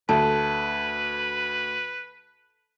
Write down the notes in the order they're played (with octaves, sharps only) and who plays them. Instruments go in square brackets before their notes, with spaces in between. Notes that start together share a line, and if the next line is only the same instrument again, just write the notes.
[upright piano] D2 [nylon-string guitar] A4 [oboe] B4 [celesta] A5